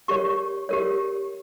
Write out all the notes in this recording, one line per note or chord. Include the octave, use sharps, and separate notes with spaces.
G4 A#4 C#5 C#6
G4 A#4 C#5